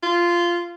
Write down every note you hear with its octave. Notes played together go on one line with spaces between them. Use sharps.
F4